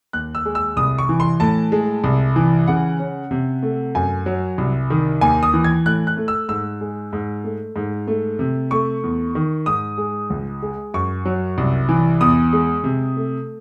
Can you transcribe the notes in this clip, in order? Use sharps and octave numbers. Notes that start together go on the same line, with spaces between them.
D#2 F#6
E6
G#3
E6
C2 D#6
C#6
E3
C6
A2 A5
G#3
C2
E3
C#3 F#5
C#4
C3
A3
F#2 G#5
F#3
C2
D#3
D#2 G#5
D#6
E3
G#6
A2 F#6
F#6
A3
E6
G#2 E6
G#3
G#2
A3
G#2
A3
C3
A3 C#6
E2
D#3
G#2 D#6
G#3
C#2
G#3
F#2 C#6
F#3
C2
E3
E2 D#6
G#3
C3
A3